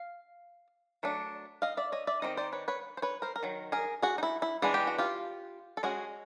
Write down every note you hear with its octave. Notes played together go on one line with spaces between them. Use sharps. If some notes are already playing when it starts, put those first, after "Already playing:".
Already playing: F5
F#3 A3 D4
D#5 F5
D5 E5
C#5 D#5
D5 E5
D#3 G#3 C4 D#4 D#5
C5 D5
B4 C#5
B4 C#5
C5
B4 C#5
A#4 C5
A#4
D#3 F#3
G#4 A#4
F#4 G#4
D#4
E4
E4
E3 G#3 B3 D4 G#4
G4
F#4
F4 G4
A4
G#3 C#4 F#4 G#4